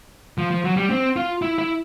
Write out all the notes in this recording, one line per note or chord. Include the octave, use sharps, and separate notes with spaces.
F3
F3
F#3
G3
C4
F4
E4
E4